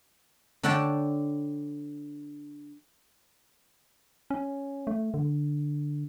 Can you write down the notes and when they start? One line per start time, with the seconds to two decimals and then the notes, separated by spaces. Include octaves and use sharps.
0.63 D3 D4 C#5 F#5 G5 A5
4.30 C#4
4.87 A3
5.14 D3